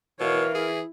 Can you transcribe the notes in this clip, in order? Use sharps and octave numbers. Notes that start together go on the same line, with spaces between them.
B2 E3 A#4 C#5 F5
E4 G#4